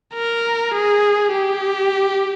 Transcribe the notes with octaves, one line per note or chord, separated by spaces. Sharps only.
A#4
G#4
G4